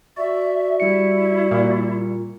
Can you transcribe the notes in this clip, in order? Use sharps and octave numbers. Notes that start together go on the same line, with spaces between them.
F#4 D5 E5
G3 E4 C#7
A#2